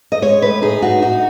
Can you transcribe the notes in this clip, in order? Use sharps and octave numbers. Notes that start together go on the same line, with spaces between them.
D#5
G#3 C#5
A2 B4
D#4 G#4
A2 F#4
D#4 F#4